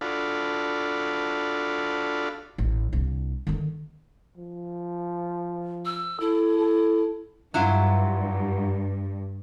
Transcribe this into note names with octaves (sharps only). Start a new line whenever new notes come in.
D4 F4 F#4 A4 F5 B5
A1
C2 D4
D3 D#3
F3
E6
E4 A4
A4
G2 F#3 E4 F4